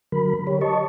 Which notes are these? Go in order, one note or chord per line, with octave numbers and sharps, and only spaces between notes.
D3 F#3 A#4 B5
G4 C#5
D#5 A5 C#6